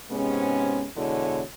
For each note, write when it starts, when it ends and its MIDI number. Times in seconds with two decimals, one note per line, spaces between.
0.10 0.86 44
0.10 0.86 48
0.10 0.86 56
0.10 0.86 59
0.10 0.86 61
0.97 1.42 40
0.97 1.42 47
0.97 1.42 50
0.97 1.42 56
0.97 1.42 64
0.97 1.42 73